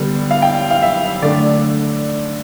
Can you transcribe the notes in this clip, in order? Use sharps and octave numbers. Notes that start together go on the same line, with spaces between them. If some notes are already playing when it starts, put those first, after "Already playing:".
Already playing: D3 G3 B3
F5
G5
F5
E5
D3 A3 D4 D5